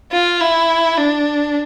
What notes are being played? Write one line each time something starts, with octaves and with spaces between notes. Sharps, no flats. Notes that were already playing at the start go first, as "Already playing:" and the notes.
F4
E4
D4